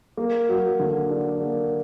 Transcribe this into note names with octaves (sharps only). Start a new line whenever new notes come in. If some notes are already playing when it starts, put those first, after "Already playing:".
A#3
F#3
D3
D4
A#3